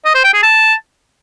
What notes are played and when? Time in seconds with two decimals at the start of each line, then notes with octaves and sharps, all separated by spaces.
0.05 D#5
0.15 C5
0.24 G5
0.33 G#4
0.43 A5